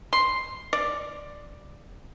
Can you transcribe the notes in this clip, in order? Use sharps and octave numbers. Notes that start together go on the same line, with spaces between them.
C6
D5